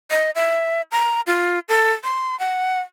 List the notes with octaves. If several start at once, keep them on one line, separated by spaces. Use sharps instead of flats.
D#5
E5
A#5
F4
A4
C6
F#5